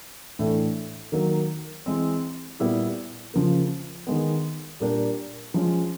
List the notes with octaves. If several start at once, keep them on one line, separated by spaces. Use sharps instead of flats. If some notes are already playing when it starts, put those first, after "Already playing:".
A2 E3 A3 D4
D#3 F#3 A#3
E3 G#3 C4
A#2 G3 B3 E4 G4
C#3 F3 A#3
D#3 G#3 B3
A#2 G3 A#3 D4 G4
F3 G#3 C#4